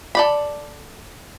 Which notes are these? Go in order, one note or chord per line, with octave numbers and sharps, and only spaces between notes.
A4 D5 B5